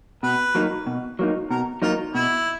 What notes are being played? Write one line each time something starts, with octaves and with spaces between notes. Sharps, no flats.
B2 B4
F#3 A#3 D#4
B2
F#3 A#3 D#4
B2 A#4
F#3 A#3 D#4 F4
B2 E4